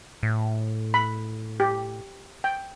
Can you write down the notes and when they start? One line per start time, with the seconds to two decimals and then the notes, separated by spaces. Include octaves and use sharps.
0.23 A2
0.94 B5
1.60 G4
2.44 G5